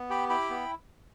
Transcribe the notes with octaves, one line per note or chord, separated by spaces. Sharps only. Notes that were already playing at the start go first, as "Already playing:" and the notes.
Already playing: B3
G4 G5 B5
E4 G5 B5
B3